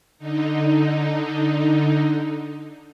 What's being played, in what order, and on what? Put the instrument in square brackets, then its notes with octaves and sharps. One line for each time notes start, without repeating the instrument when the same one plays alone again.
[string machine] D3 D#4